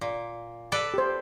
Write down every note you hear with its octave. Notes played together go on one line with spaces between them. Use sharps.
A#2
A4 B4 D5
G4 C5